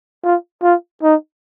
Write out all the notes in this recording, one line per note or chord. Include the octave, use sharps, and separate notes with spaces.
F4
F4
D#4